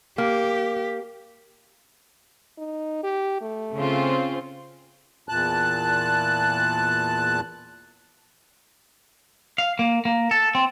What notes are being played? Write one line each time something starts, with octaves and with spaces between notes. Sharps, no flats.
A#3 G4
D#4
G4
A3
C#3 C4 F4
E2 A#2 A5 F#6
F5
A#3
A#3
A4
C4